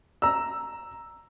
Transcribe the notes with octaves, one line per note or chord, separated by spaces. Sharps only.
A#5 E6